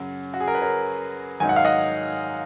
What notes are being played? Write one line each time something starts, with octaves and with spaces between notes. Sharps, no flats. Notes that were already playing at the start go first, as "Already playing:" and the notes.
Already playing: F#2 C#3 F#3
F#4
G#4
A#4
B4
A#4 C#5
G#2 D#3 F#3 G#5
F#5
F5
D#5 F#5